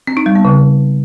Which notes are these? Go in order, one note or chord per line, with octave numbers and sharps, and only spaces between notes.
C4
D#4
G3
B3
C#3